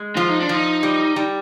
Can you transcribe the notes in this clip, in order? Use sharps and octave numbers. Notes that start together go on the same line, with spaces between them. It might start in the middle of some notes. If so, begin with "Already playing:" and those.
Already playing: G#3
F3 F4
D#4
D4
F3 D#4
G3
G3